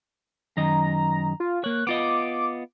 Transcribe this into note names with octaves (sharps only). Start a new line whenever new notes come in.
F#2 D#3 D#5 A#5
F4
A#3 C#5 F#6
B3 F4 D#5 D6